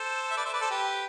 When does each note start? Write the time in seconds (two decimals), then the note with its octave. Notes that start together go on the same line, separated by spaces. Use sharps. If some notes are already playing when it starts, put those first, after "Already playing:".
Already playing: A4 C5
0.31 E5
0.37 B4 D5
0.45 C5 E5
0.53 B4 D5
0.61 A4 C5
0.71 G4 B4